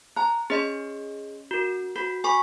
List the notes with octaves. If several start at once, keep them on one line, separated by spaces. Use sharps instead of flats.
A5 A#5 F#6
C#4 G#4 D#5 C6
F#4 A#4
F#4 B4
B4 G#5 C#6 D6